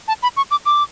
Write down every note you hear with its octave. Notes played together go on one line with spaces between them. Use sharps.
A5
B5
C#6
D6
D6